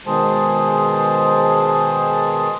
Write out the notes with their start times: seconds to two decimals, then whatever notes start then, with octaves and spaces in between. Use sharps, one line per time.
0.07 B2 D#3 G#3 G#4 C5 A5